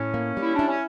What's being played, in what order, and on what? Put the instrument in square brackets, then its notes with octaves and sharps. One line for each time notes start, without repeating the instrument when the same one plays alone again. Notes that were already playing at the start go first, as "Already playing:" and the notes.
Already playing: [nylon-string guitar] A2 [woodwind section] C#4
[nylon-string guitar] A#3
[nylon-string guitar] G3 [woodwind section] E4
[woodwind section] D4 [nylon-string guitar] E4
[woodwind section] C#4